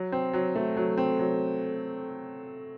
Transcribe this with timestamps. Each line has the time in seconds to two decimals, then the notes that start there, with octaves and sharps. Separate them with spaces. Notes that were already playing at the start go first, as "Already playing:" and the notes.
Already playing: F#3
0.12 C4
0.33 F#3
0.56 A3
0.77 F#3
0.97 C4
1.19 F#3